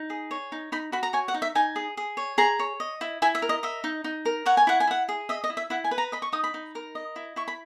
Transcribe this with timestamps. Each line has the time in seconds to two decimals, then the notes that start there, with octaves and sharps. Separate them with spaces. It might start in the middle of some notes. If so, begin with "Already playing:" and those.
Already playing: D#4
0.10 G#4
0.31 C#5
0.52 D#4
0.72 D#4 B5
0.92 F#4 B5
1.03 A#5
1.13 C#5 G#5
1.28 F#5
1.34 D#4
1.42 E5
1.55 D#4 G#5
1.76 G#4
1.97 G#4
2.17 C#5
2.38 G#4 A#5
2.59 C#5
2.80 D#5
3.01 E4
3.22 E4 G#5
3.35 E5
3.42 A#4
3.49 D#5
3.63 D#5 E5
3.84 D#4
4.04 D#4
4.25 A#4
4.45 C#5 F#5
4.57 G#5
4.67 E4 F#5
4.80 G#5
4.87 E4 F#5
5.09 G#4
5.29 D#5 E5
5.44 D#5
5.50 E4
5.57 E5
5.70 E4 F#5
5.84 G#5
5.91 B4
5.98 A#5
6.12 D#5 B5
6.22 C#6
6.32 D#4 D#6
6.44 B5
6.54 D#4
6.75 A#4
6.95 D#5
7.16 E4
7.36 E4 C#6
7.48 B5